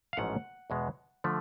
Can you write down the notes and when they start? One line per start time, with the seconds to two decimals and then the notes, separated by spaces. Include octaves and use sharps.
0.13 F5
0.17 A1 G#2 F3 A3 C#4 F#5
0.70 E2 B2 G#3 B3
1.24 D3 F3 A3